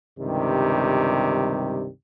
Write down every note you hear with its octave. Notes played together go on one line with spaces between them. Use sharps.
C#2 G2 C3 D#3 G3